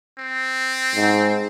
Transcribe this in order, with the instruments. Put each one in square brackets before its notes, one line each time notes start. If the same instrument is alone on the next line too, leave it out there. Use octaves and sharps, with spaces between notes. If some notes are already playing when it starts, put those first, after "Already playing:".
[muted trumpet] C4
[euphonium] G#2